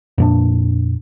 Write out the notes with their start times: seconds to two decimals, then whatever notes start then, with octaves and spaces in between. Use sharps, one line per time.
0.18 F2 A#2 D4